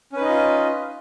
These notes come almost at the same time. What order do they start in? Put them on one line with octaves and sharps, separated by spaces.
C#4 B4 D#4 D#5 F4